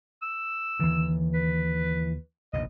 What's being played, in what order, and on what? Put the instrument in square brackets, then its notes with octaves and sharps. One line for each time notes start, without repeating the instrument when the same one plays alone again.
[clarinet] E6
[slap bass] D#2 D3 [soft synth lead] E3
[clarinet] B4
[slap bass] F1 A#1 D#2 [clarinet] D#5